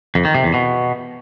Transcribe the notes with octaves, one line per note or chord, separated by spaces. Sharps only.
F2
D#3
C3
E2
B2